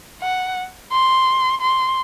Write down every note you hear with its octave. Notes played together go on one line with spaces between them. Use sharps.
F#5
C6
C6